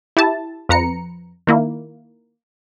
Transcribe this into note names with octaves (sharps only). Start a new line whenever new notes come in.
E4 G4 A5
F2 B4 A#5 C#7
D#3 A#3 E4